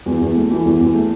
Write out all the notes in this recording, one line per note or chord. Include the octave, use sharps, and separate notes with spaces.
E2
E2
A3
E3
E2
E2
A3